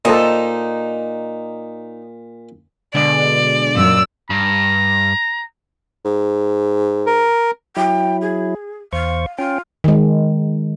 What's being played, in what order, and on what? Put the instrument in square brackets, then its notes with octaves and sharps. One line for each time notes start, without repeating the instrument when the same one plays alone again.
[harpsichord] A#2 [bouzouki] D#4 [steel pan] A4 C5 D#5
[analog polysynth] B2 D3 G#3 [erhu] D5
[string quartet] F#2 E6 [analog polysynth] A#2
[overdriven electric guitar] G2 [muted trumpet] A#5
[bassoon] G#2
[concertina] A#4
[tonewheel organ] F#3 E4 [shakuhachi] G5
[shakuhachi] G#4
[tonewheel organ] E2 C5 C#6 [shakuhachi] F5
[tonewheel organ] C#4 G5 [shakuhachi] F4
[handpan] D#3 G#3